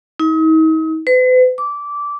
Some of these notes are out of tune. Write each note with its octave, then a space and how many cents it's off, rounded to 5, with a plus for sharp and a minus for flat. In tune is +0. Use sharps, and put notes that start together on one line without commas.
D#4 +40
B4 +45
D6 -15